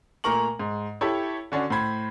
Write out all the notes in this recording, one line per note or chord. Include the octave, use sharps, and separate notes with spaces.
A#2 A3 A#4 A#5 C#6 F#7
G#2
E4 G4 A4 C#5
D3 C#4 D4 F#4
A2 C5 B5 G#6